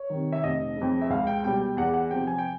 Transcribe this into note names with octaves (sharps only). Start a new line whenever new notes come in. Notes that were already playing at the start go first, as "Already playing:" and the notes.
Already playing: C#5
C3 D#3
E5
F1 D#5
F2 C#3
E5
C#2 F5
G5
B2 G3 G5
G5
E2 F#5
F#5
C3 F3 G5
G#5
G5